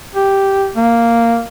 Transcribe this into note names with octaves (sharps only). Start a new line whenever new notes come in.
G4
A#3